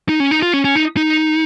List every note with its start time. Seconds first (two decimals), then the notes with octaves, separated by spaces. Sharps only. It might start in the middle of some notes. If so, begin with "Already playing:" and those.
0.09 D#4
0.20 C#4
0.31 D#4
0.43 F4
0.53 C#4
0.65 C#4
0.76 D#4
0.97 D#4